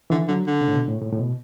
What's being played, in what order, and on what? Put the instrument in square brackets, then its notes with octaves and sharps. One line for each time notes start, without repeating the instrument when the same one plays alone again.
[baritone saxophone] D3 [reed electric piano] E3
[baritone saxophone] D3 [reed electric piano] F#3
[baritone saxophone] D3
[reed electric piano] C#3
A2
B2
A2
A2
A2
B2